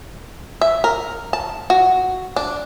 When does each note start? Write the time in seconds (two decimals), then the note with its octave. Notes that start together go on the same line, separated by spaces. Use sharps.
0.61 E5
0.84 A#4
1.33 A5
1.70 F#4
2.36 D4